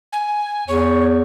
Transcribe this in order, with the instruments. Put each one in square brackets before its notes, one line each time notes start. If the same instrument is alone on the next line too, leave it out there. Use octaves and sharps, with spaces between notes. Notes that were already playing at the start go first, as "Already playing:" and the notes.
[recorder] G#5
[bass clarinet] E2 [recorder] C#5